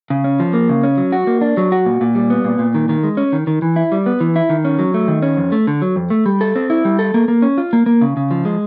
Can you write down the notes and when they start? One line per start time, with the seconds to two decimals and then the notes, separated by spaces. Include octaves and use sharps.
0.10 C#3
0.24 C#4
0.40 F3
0.53 A#3
0.69 C#3
0.83 C#4
0.97 F#3
1.12 F#4
1.27 A#3
1.41 D4
1.57 F#3
1.72 F#4
1.86 A#2
2.01 A#2
2.15 G3
2.30 B3
2.44 A#2
2.59 A#2
2.75 D#3
2.89 D#3
3.04 G#3
3.17 C#4
3.33 D#3
3.47 D#3
3.62 E3
3.76 E4
3.92 G3
4.06 B3
4.20 E3
4.36 E4
4.50 D#3
4.65 C#4
4.79 F#3
4.94 A3
5.08 D#3
5.22 C#4
5.37 F2
5.52 A3
5.67 D3
5.82 F#3
5.96 F2
6.10 A3
6.26 G3
6.41 A4
6.56 C4
6.70 E4
6.85 G3
6.99 A4
7.14 A#3
7.28 A#3
7.42 C#4
7.58 F4
7.73 A#3
7.86 A#3
8.01 C#3
8.17 C#3
8.31 F3
8.45 G#3